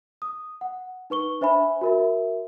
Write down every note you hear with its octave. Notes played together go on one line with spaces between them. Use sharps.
D#6
F#5
D#4 B4 C#6 G7
D4 C5 E5 G#5 B5
F#4 A#4 E5